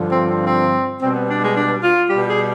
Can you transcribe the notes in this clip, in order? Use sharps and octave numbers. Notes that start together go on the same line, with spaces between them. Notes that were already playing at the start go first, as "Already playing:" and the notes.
Already playing: G2 D3 F3
C4
C4
C4
B2 G3 C4
B3
D4
G#3
D4
F4
B2 G3 G4
G#4